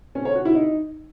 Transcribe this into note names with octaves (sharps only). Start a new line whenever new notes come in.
C#4
C#5
F#4
E4
D#4